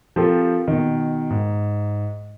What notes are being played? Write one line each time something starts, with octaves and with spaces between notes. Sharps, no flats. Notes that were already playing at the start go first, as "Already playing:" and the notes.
F3 C4 F4 G4 A4 A#4
B2 D#3
G#2